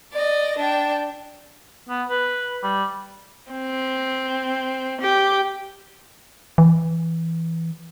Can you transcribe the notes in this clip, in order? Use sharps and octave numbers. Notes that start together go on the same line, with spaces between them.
D5 D#5
D4 G5
B3
B4
G3
C4
G4
E3